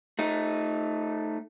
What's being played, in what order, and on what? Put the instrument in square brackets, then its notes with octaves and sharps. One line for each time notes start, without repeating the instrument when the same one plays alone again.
[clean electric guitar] A3 D#4